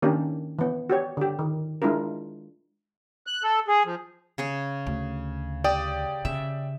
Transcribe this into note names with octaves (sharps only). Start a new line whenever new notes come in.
D#3 A#3 C#4 D4 G4
E3 B3
F#4 G4 C#5
D3 G4
D#3
G#3 D4 E4 F4 A#4
F#6
A4
G#4
F3
C#3 G#4 C#5
D2
G4 D5 G5 D#6
C#3 E5